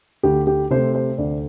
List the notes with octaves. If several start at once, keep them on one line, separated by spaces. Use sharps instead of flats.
D2 G4
G4
C3 A3 C5
C5
D2 D5